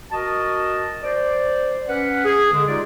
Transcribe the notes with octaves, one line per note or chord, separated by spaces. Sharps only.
F#4 A#4 D#5 A5
C5 D5
C#4 B4 F#5
G#4
D3 G#3
G#3 D#4 F4 G4 D5